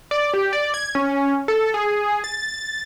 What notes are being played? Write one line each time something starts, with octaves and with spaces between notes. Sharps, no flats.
D5
G4
D5
G#6
C#4
A4
G#4
A6